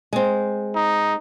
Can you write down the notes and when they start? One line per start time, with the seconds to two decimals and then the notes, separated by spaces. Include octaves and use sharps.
0.13 G#3 C4
0.75 D#4